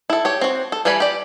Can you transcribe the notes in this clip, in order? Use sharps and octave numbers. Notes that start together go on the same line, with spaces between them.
E4 A4
G4 C#5
C4 F#4
A4
E3 G3 B4 G#5 B5
G4 D5